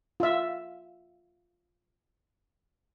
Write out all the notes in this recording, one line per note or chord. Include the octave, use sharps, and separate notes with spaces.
F4 E5